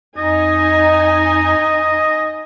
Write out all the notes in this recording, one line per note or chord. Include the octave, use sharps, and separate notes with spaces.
F2 D#4 D#5 G#5